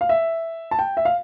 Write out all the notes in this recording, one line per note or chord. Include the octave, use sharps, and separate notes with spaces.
F5
E5
A5
G5
E5
F5